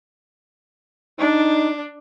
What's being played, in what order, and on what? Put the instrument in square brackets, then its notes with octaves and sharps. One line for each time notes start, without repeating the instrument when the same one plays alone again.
[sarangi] D4 [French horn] D#4